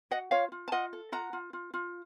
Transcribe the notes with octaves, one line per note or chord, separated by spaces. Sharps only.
F#4 D#5 F#5
F4 C#5 F5
F4
A5
F4 D#5 F#5
A4
F4 F#5 A#5
F4
F4
F4